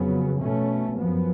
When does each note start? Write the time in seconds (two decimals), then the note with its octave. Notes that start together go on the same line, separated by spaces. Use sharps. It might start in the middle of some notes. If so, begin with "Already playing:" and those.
Already playing: F2 C#3 F#3 B3
0.41 B2 A3 C#4
0.99 F#2 F3 B3